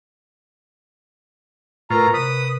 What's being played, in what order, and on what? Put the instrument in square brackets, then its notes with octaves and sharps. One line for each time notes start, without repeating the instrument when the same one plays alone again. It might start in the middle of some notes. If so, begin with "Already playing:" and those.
[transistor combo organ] A2 F4 [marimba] A#4 B4 C#6 [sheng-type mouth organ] A#5
[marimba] C3 [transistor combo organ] B4 [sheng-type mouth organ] D#6